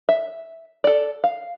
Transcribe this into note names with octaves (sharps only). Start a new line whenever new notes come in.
E5
A4 D5
F5